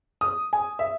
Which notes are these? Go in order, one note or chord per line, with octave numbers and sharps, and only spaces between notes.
D#6
G#5
E5